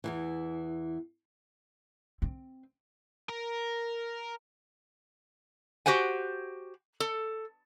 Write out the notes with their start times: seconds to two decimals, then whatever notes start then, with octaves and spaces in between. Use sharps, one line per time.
0.04 E2 G2 E3
2.22 C4
3.29 A#4
5.86 F#4 G4 C5 F#5 G#5
7.00 A4